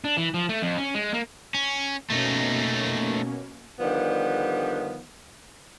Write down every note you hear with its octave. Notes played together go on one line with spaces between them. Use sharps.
D4
E3
F3
A3
F2
C#4
G#3
A#3
C#4
B2 A3 A#3 C#4 D#4
D3 D#3 F3 G3 B3